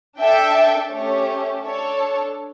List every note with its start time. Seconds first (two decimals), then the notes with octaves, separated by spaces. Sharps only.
0.19 D4 A4 E5 G5
0.92 A3 C#4 G4 C#5
1.64 D4 A4 C#5